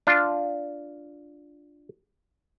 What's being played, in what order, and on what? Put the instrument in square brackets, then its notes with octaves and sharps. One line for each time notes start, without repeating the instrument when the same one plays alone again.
[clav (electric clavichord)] D4 F4